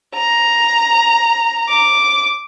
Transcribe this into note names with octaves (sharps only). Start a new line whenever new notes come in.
A#5
D6